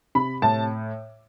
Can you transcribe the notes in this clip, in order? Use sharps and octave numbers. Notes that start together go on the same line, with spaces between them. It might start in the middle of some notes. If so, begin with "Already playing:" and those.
C3 B5
A2 A5